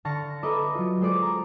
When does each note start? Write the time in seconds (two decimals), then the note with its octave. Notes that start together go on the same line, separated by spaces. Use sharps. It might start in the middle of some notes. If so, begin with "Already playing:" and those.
0.05 D3 F5 A5 C#6 A#6
0.43 A4 B4 D#5 E5 A#5 D6
0.75 F#3 F4
1.01 G#3 C5 D5 D6 C#7
1.22 A#5